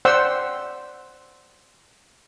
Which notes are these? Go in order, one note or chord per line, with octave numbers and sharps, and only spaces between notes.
C5 D5 F#5 G5 C6 E6